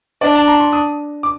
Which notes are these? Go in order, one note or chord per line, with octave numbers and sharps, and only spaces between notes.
D4 D5
A5
A#5
C6
D#6
D6